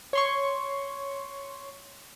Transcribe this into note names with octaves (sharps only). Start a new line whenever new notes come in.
C#5 C6 C#6